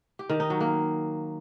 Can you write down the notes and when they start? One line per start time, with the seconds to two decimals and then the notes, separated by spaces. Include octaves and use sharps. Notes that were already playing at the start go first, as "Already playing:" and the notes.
0.19 G4
0.30 D#3
0.40 D#4
0.50 F#3
0.61 A#3